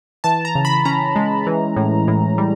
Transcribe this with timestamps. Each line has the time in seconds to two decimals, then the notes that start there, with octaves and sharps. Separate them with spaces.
0.24 E3 A5
0.45 A#5
0.55 C#3
0.65 B5
0.85 C#4 A#5
1.16 G#3
1.47 E3
1.76 A2
2.08 A2
2.38 G3